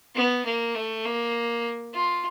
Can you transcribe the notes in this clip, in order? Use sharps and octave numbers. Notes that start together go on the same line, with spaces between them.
B3
A#3
A3
A#3
F4